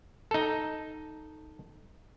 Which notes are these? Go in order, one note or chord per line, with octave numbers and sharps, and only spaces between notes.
D#4 A4